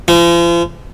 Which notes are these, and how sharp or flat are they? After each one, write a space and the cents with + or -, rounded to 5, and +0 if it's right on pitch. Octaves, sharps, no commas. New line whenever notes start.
F3 -40